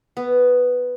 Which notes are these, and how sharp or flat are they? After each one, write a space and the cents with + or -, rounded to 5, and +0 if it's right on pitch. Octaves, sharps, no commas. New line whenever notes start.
B3 +5